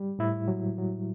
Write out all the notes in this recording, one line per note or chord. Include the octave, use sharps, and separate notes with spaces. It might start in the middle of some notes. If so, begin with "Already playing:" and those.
Already playing: G3
A2 E4
F#3
F#3